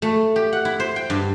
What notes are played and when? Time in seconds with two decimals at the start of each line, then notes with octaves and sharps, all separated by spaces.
0.02 A3
0.36 G4
0.53 F#5
0.65 E4
0.80 C5
0.96 G5
1.10 G2